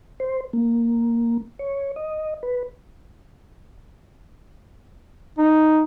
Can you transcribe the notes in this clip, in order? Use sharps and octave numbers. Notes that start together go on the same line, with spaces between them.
C5
A#3
C#5
D#5
B4
D#4